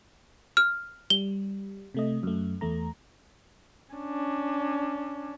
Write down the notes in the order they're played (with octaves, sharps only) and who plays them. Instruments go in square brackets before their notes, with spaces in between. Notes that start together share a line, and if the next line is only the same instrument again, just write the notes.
[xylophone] F6
[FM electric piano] G3 [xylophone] G7
[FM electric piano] C3 A3 D#5
F#2 A3
E2 A3 A#5
[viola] C#4 D4